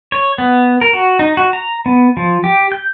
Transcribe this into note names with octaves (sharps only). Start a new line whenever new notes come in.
C#5
B3
A#4
F#4
D#4
F#4
A#5
B3
F3
G4
G6